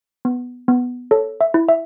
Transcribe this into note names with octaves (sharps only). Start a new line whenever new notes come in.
B3
B3
A4 C#5
E5
E4
E5